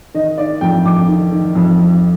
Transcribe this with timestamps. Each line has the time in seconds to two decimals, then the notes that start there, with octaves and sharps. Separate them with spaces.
0.14 D#3 D#5
0.38 D#3 D5
0.61 F2 G5
0.85 F2 D6
1.08 D#3
1.32 D#3
1.55 F2
1.79 F2